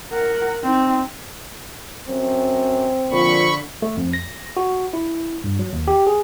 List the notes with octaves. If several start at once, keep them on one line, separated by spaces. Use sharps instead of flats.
A#4 F#5
C4 D#4
F#2 C4
A#2 D3 F3 B5 C#6
A3
F2
A#6
F#4
E4
G2
F#3
D#2
G4
G#4